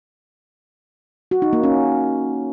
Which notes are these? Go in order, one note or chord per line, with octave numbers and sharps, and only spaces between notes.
F#4
D#4
A#3
C#4